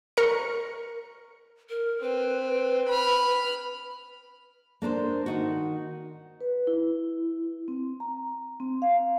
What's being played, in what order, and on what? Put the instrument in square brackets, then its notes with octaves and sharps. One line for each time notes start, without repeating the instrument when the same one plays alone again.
[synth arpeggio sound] A#4 C#6 C#7
[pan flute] A#4
[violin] C4 [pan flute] B4
[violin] B5 F6
[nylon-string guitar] A#3 D4 A#4 C5
D#3 D#4 F#4
[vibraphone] B4
E4
C4
A#5
C4
F5